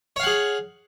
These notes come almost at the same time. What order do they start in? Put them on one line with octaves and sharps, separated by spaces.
C#5 F5 F#5 G#4